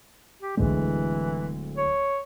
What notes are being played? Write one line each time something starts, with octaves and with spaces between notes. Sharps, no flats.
G4
D1 D2 E3 G#3
C#5